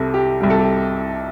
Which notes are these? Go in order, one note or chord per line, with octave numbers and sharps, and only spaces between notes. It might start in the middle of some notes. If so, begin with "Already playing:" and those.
Already playing: C2 C3 G3 A4
G4
C2 C3 G3 G4
A4
G4